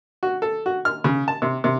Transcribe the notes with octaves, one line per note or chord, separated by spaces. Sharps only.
F#4
A4
F#4
F6
C#3
A5
C3
C3